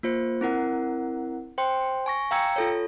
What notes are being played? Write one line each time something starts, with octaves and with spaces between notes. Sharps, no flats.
A#3 F4 C5
C4 E4 A#4 F#5
C5 G5 C6
G#5 C#6 A#6
F5 G5 A#5 E6 G#6 C#7
F4 A4 C#5